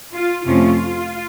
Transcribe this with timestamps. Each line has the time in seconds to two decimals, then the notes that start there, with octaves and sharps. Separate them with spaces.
0.13 F4
0.45 F2 C3 F3 A3 C#4 F4